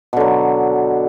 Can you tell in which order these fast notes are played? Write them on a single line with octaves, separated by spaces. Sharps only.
B2 D3 F#3